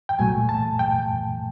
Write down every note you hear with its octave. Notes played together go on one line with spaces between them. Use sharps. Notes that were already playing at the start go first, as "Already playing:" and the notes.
G5
C2 A#2 F#3 A3 G#5
A5
G5